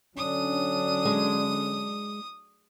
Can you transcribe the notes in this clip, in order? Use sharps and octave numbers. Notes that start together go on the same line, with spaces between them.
D3 F#3 C#4 D4 D#6
G#3